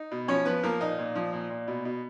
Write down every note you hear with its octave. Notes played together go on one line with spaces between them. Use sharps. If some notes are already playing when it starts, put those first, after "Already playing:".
Already playing: D#4
B2
F3 C#4 C#5
F3 B3 B4
F3 A#3 A#4
A#2 D#4 D#5
A#2
F3
A#2
A#2
B2
B2